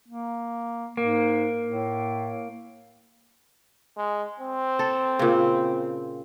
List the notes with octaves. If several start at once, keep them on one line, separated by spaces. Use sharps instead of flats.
A#3
G#2 A#3
A2
G#3
C4
A4
A#2 C#3